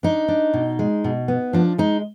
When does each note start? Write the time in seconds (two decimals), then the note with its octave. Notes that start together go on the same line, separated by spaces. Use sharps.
0.03 D4 D#4
0.28 D4
0.54 B2
0.79 G#3
1.04 B2
1.28 B3
1.53 F3 D4
1.78 G#3 D#4